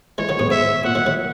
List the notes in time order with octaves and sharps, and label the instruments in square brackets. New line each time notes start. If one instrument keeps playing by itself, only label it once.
[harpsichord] E3 G#3 [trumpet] C#5
[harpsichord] D#3 F#3
G#2 B2
[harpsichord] G#2 [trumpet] E5
[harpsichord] A#2 [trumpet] F#5
[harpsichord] D#3 F#3
D#3 F#3